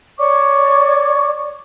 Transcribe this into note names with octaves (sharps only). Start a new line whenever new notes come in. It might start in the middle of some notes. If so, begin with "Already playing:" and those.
C#5 D5 C#6 D6